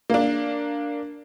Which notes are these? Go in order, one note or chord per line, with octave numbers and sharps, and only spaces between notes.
A#3 D4